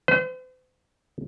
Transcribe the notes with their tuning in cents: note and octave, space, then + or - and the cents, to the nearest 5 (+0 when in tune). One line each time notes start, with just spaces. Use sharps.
C5 -45